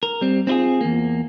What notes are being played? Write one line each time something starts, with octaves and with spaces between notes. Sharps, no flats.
A#4
G3 C4
C4 D4 E4 F4 G#4
E2 A#3